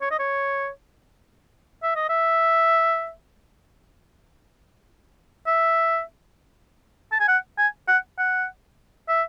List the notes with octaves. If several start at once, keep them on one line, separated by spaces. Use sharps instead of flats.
C#5
D#5
C#5
E5
D#5
E5
E5
A5
G#5
F#5
G#5
F#5
F#5
E5